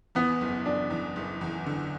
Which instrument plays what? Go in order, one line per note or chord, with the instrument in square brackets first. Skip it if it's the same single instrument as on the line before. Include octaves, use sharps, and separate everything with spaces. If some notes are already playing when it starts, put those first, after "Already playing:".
[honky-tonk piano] E2 [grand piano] B3
[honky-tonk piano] F#1
[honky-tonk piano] F#1 [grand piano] D4
[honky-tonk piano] E2
F#1
E2
D3